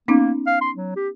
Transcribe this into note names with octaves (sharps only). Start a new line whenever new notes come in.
A#3 B3 C#4 D#4
F5
C6
F#3
G4